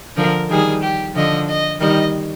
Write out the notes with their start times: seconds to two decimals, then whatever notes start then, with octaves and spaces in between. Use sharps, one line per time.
0.17 D3 F3 A#4
0.50 D#3 G3 G#4
0.82 G4
1.15 D3 F3 D#5
1.48 D#5
1.80 D#3 G3 D#5